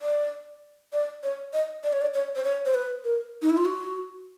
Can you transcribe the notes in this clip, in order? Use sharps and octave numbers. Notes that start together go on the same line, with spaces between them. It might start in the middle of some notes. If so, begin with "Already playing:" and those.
D5
D5
C#5
D#5
D5
C#5
D5
C#5
C5
C#5
C5
B4
A#4
D#4
E4
F4
F#4